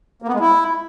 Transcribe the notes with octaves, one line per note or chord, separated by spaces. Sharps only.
A#3
B3
G#3
E4